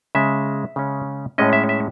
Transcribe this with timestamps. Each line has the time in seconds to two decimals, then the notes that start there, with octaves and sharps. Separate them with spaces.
0.15 C#3 G#3 C#4 E5
0.76 C#3 G#3 C#4
1.38 A2 G#3 C#4 D#5
1.53 E5
1.69 E5